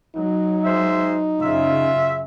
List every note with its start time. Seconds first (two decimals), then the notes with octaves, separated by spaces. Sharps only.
0.16 F#3 D#4
0.64 G#3 C5 E5
1.40 F#2 C#3 C#4 F4 E5